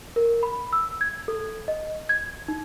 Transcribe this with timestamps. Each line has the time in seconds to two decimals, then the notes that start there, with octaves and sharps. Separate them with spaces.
0.16 A#4
0.43 B5
0.73 E6
1.01 G#6
1.28 A4
1.68 D#5
2.09 G#6
2.48 D#4